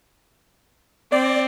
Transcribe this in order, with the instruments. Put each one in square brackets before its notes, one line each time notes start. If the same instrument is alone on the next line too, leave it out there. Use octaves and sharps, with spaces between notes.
[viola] C4 [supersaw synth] D5